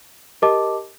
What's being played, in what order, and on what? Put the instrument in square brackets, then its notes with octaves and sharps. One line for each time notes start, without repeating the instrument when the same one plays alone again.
[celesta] G4 A#4 D#5 A5 D6